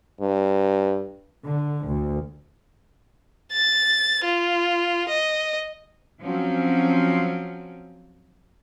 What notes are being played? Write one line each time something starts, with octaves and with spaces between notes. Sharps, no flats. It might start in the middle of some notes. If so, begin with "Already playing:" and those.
G2
D3
D2
A6
F4
D#5
F3 F#3 C4 C#4